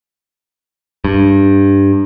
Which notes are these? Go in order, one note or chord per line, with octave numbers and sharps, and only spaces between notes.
G2